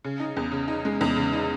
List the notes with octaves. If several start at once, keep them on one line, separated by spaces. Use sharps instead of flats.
C#3
D#4
E2
C#3
D#4
G#3
E2
C#3
D#4